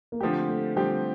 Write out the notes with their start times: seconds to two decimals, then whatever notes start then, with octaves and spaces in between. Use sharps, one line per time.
0.12 A#3
0.21 D3 F3 A3 C4 G4
0.48 A3
0.76 D3 F3 G3 C4 G4